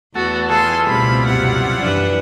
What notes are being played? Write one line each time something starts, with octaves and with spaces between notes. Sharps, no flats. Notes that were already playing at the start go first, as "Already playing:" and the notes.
E2 A3 B3 F#4 F#5 A5
E3 F4 G#4 A4 C6
C#2 B2 G3 A3 C4 E4 F4 B5
F#2 C3 F#5
F#2 E3 F3 D4 G4 B4